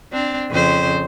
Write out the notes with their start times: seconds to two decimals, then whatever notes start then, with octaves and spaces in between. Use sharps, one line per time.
0.13 C4 D4
0.50 F2 C#3 C5